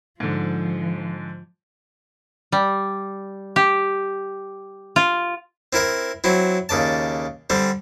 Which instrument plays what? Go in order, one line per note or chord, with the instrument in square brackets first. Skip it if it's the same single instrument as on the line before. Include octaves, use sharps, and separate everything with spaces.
[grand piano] G#2 D3 [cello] F3
[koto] G3
G4
F4
[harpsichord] C4 E4 A#4 E5
F#3 C4 E4
D#2 C#3 D5 A5
D3 G3 C4